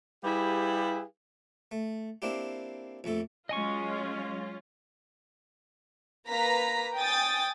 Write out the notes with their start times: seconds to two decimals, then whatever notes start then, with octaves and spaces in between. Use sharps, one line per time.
0.24 G3 E4 G4 G#4 B4 F5
1.71 A3
2.22 A#3 C4 D4 E4 G4
3.04 A#1 F2 A3 A4
3.49 F#3 G#3 C#4 F4 D#5 G#5 C#6
6.29 A#3 B4 A#5 B6
6.97 G5 G#5 D#6 A6